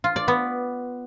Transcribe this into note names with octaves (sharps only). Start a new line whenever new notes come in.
F4
D5
B3